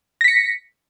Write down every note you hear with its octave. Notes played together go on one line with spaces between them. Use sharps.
A#6 B6 C#7